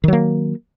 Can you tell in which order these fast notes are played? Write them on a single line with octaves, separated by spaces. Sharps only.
D#3 F#3 A#3